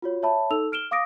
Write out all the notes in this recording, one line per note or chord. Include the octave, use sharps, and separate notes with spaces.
F4 F#4 C#5
C#5 E5 A5 B5
D#4 A4 E6 F7
F6 D7 E7 G7
F5 D6 D#6 A#6 D7